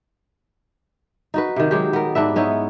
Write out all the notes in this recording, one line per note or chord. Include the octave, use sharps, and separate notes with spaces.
D#4 F#4 B4
C3 D#3
F#3 G#3 G4
B3 A#4
G#2 D4 B4 E5
B3 C#4 D#4 E4